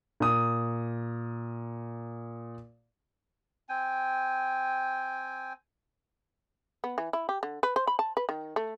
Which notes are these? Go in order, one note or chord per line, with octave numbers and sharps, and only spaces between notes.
A#2 D#6
C4 G5 G#5
B3
E3
E4
G4
D3
B4
C5
B5
A5
B4
D#3
A3